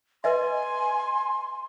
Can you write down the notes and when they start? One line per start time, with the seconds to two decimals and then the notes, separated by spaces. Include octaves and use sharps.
0.24 B4 D#5 E5 G#5 C6